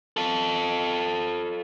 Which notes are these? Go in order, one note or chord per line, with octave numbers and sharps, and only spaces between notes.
F4 A4